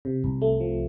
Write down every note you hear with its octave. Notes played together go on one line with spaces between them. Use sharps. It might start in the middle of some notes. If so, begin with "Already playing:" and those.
C3
C2
A3
F3